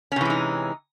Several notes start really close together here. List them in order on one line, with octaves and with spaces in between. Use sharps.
C#4 C3 E3 G#3 D#4